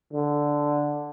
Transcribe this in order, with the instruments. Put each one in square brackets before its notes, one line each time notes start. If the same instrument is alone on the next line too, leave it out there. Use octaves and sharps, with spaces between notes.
[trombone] D3